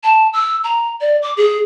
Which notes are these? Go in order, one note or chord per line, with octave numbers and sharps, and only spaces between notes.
A5
E6
A#5
D5
D6
G#4